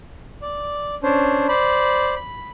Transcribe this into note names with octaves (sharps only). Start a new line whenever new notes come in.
D5
C#4 D4 C5
C5 D5 B5
B5